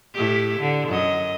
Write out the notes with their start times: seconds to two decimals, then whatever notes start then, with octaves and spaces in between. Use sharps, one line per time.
0.15 A2 E4 G4
0.60 D3
0.88 F#2 D#5